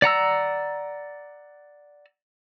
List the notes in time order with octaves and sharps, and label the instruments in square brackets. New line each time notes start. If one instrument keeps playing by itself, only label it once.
[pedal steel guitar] D5 F#5 A#5 E6